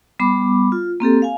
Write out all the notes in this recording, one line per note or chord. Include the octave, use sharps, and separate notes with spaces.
G3 B3 B5 D6
F4
A#3 C4 G4 A4
F5 G#5